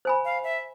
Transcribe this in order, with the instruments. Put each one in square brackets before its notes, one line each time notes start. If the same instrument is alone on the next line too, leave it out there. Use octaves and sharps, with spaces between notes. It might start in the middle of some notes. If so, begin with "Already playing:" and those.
[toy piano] C5 G#5 B5
[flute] F5
E5